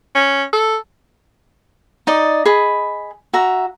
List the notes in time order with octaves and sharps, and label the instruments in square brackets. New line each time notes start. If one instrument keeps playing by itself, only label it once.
[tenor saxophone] C#4
A4
[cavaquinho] D#4 D5 D#5
G#4 D#5 B5
F#4 E5 A#5